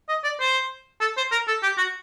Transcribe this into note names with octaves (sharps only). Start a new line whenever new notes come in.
D#5
D5
C5
A4
C5
A#4
A4
G4
F#4